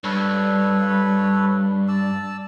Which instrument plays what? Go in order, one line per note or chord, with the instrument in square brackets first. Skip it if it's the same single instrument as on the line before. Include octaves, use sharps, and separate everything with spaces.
[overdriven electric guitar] G2 [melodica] A4 B4 C#5
[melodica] D5 A5 E6